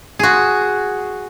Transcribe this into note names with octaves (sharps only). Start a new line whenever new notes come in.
F#4 G#4